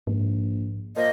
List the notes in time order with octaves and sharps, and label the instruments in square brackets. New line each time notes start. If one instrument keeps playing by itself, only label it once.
[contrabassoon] A#1 [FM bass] G#2
[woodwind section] A#2 F3 A#3 [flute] D#5